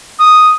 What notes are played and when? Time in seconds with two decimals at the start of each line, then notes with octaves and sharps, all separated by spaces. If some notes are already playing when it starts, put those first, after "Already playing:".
0.20 D#6